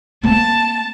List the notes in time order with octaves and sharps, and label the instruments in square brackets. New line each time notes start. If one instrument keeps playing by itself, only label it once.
[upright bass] A#3 C4 [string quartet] A5